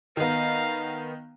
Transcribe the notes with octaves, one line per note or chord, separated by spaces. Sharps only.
D#3 B3 F5 A#5